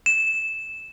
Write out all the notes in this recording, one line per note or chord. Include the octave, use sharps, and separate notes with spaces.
E7